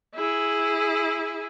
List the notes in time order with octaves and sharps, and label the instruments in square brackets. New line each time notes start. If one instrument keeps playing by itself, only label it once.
[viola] E4 G#4